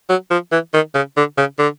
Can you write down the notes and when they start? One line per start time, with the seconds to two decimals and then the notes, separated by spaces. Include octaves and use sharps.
0.09 F#3
0.31 F3
0.52 E3
0.74 D#3
0.95 C#3
1.17 D3
1.38 C#3
1.59 D3